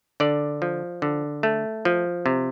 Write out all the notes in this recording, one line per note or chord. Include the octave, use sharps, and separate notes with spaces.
D3 D5
F3
D3
A3
F3
C3